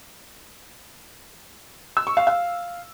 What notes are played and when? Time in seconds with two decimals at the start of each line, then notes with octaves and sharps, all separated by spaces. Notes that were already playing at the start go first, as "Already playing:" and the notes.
1.97 E6
2.07 C#6
2.17 F5
2.27 F5